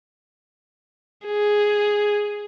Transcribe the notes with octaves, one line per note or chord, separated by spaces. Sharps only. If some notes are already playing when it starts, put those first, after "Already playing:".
G#4